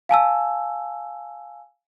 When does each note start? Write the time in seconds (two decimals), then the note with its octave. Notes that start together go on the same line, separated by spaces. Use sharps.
0.09 F5 G#5 A5 E6